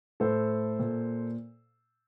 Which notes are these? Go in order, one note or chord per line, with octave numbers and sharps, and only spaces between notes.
A2 A4 C5
A#2